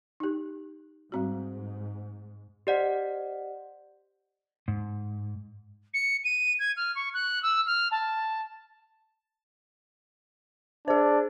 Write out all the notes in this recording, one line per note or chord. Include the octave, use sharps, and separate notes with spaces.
D#4 G4
G#2 G3 C4 F#4
G4 C5 D5 D#5 F#5
G#2
C#7
D#7
G#6
F6
C#6
F#6
E6
F6
A5
D4 G#4 C5